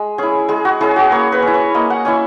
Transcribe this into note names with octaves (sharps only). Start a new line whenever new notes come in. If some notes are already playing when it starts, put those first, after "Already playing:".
Already playing: G#3
C#4 E4 G#4
G#3 G#4
F#4
C#4 E4 G#4
F#4
A#3 C#5
B4
C#4
E4
C#5
A#3 D#5
F#5
C#4 E4 G#5